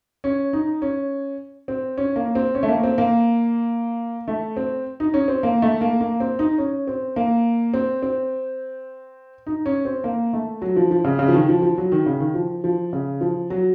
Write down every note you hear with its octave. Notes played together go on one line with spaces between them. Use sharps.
C#4
D#4
C#4
C4
C#4
A#3
C4
C#4
A3
A#3
C4
A#3
A3
C4
D#4
C#4
C4
A#3
A3
A#3
A#3
C4
D#4
C#4
C4
A#3
C4
C4
D#4
C#4
C4
A#3
A3
F#3
F3
F3
C#3
C#3
F3
D#3
F3
F3
F#3
D#3
C#3
D#3
F3
F3
C#3
F3
F#3